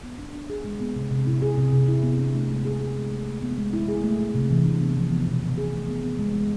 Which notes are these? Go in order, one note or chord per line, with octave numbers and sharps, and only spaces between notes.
B3
D4
D4
G#4
G#3
B3
C3
C3
E4
G#4
C3
C3
E4
B3
D4
A3
G#3
G#4
G#4
G#3
A3
A3
B3
G#3
E4
G#4
A3
A3
C3
E3
D4
B3
F3
B3
B2
B2
G#4
A3
B3
B3
G#3
G#3